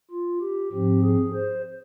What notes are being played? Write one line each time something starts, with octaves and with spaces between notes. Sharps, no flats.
F4
G4
G#2 F3 C4 G4
G#4
C5